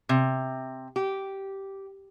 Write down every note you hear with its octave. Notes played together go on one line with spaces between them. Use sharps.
C3
G4